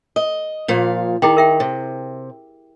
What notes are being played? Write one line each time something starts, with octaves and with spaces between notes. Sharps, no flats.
D#5
A#2 F3 F5
D#3 E4 G#4 G5
A#4 E5 G5
C3